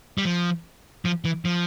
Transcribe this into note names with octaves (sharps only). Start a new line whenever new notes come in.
G3
F3
F3
E3
F3